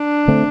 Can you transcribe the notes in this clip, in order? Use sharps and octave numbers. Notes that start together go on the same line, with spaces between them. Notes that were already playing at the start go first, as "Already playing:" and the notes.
Already playing: D4
D3 A3 C4